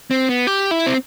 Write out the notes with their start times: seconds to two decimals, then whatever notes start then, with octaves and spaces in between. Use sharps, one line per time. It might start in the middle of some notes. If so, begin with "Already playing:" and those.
0.11 C4
0.29 B3
0.47 G4
0.71 E4
0.86 C4